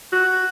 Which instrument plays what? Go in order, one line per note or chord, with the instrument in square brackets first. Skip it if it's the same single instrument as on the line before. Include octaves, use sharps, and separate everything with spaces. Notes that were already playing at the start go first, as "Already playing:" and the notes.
[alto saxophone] F#4